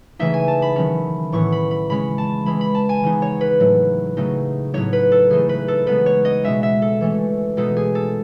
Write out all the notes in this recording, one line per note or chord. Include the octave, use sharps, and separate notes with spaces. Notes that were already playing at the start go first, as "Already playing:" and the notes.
C#3 E3 A3 D#4 E5
G#5
A5
B5
D#3 F#3 C#4
A2 E3 B3 C#6
B5
B5
C#3 G#3 C#4 B5
A5
E3 G#3 C#4 B5
B5
A5
G#5
C#3 E3 B3 D#4
C#5
B4
A2 F#3 A3
C#3 F#3 A3 D#4
A2 F#3 B3 D#4 C#5
B4
A4
C#3 E3 A3 D#4 G#4
B4
A4
C#3 G#3 B3 D#4 B4
C#5
D#5
B2 G#3 C#4 E5
E5
A4
E3 A3 C#4
B2 G#3 B3 D#4 A4
G#4
A4